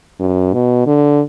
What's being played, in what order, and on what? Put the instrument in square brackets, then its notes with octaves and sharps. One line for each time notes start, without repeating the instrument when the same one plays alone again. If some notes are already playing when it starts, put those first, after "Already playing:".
[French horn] F#2
B2
D3